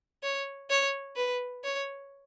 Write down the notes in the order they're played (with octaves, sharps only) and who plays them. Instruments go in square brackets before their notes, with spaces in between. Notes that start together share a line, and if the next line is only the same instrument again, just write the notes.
[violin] C#5
C#5
B4
C#5